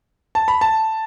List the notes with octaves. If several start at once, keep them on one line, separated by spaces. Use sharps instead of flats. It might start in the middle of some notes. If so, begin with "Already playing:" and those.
A5
B5
A5